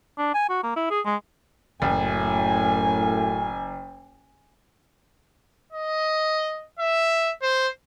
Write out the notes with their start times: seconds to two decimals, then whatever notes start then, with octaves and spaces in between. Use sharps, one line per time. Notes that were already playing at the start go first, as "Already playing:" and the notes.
0.18 D4
0.34 G#5
0.49 F#4
0.63 A#3
0.76 E4
0.90 G#4
1.05 G#3
1.82 F#1 F#2 A2 G#5
5.72 D#5
6.79 E5
7.42 C5